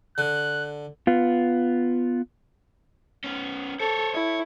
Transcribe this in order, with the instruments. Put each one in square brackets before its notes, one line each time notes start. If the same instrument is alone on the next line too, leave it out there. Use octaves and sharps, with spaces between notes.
[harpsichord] D3 [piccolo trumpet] F#6
[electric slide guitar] B3 F4
[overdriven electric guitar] B3 C#4
[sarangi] A4 [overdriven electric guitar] C5 C#5
[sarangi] E4 [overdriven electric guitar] C#5